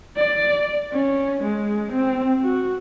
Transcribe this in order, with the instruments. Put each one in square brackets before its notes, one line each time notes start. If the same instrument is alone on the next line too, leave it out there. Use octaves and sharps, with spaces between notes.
[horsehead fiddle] D5
C#4
G#3
C4
F#4